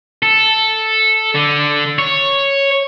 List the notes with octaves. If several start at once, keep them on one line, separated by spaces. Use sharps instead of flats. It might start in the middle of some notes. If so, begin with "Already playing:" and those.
A4
D3
C#5